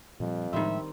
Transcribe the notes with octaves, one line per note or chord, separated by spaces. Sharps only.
F2 A#2 F3 G3
A2 D#3 F3 G3 G#3 C4 E5